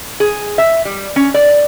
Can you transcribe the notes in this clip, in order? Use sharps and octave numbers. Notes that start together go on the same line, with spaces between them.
G#4
E5
G3
C#4
D5